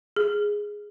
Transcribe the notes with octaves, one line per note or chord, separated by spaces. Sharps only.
G#4